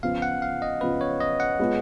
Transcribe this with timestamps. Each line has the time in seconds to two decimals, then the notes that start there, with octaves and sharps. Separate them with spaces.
0.03 C#3 F3 B3 F4 F5
0.22 F#5
0.42 F5
0.62 D#5
0.81 C#3 F3 B3 F4 B4
1.01 C#5
1.20 D#5
1.40 F#5
1.59 G#3 B3 F4 G#4